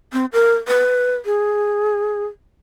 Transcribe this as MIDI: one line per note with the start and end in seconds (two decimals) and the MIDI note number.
0.13 0.25 60
0.33 0.54 70
0.68 1.15 71
1.25 2.25 68